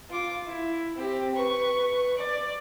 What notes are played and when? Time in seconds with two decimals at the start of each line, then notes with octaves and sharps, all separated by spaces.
0.10 F4 D6
0.46 E4
0.96 C4 G4
1.35 B4 C#6
2.17 D5